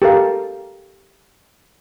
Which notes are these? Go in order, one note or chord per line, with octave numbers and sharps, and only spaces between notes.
G4 A4 A#4 F5